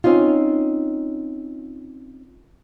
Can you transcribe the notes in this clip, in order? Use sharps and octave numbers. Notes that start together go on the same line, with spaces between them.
C4 C#4 D#4 F4